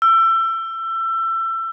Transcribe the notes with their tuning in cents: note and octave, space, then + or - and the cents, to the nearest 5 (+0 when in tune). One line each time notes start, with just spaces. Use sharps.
E6 +25